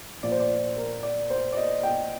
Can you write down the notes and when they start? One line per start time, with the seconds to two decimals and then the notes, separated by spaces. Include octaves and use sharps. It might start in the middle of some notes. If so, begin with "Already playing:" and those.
0.23 A#2 F3 D5
0.32 C5
0.40 D5
0.76 A#4
1.03 D5
1.30 C5
1.53 D5
1.57 D#5
1.83 G5